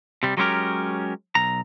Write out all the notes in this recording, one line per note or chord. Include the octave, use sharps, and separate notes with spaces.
C3 G3
F#3 G#3 B3 C#4 G4 A#4
B1 A#5